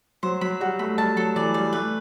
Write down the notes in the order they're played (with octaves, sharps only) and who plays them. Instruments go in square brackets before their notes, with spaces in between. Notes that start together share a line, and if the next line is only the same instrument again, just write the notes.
[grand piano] F#3 [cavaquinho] C5
[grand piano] F#3 [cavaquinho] B5
[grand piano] G3 [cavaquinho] F#4
[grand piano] A3 [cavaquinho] B5
[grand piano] G3 [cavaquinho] A5
[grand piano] F#3 [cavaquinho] A4
[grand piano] E3 [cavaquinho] D5
[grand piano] G3 [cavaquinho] D5
[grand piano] A3 [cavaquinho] B4